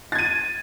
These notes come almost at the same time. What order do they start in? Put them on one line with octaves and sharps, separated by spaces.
A6 G#6 D#7